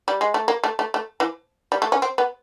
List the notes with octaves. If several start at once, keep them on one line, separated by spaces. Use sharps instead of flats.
G3
G#3
A3
A#3
A3
A3
A3
E3
G3
A3
C#4
C4
B3